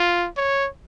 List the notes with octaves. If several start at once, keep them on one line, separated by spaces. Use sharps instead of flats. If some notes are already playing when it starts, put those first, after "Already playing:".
Already playing: F4
C#5